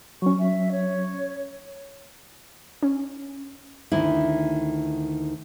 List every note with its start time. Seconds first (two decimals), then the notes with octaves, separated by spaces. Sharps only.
0.22 F#3 C#4 C#6
0.39 E5
0.72 C#5
2.83 C#4
3.92 D2 D#3 E4